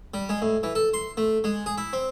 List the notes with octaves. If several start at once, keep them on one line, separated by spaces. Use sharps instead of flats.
G3
G#3
A2
E3
A4
C6
A3
G#3
G#4
E4
C4